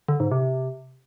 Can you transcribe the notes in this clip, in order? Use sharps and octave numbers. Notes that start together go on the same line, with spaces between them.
D3
G#2
C3